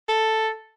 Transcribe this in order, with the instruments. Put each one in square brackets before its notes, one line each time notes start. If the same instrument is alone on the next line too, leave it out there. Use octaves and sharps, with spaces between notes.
[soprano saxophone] A4